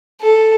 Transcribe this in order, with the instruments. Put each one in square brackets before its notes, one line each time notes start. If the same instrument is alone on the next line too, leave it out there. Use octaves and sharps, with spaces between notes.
[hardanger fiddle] A4